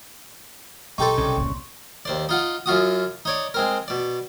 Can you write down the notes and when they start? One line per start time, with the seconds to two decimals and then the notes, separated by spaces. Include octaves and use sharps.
0.98 B1 D#4 G4 A4 C6 C#6
1.18 C2 C#3
1.37 D#2 A2
2.05 D#2 C5 D5
2.29 D#4 F4 F#5
2.66 F#2 F4 F#4 D#6
3.25 D#4 C#5 D5
3.54 G#3 C4 A#4
3.88 B2 D5